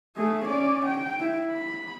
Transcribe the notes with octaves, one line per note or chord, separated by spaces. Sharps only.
A3 G#4
C#4 D5
G5
E4
B5